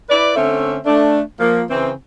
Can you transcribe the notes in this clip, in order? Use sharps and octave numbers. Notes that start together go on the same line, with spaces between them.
E4 B4 D5
D3 A3 C4 C#4 E5
A3 D4
F3 A#3
C#3 E3 C4